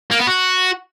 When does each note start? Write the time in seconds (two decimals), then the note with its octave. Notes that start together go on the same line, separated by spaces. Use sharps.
0.11 A#3
0.19 B3
0.27 F#4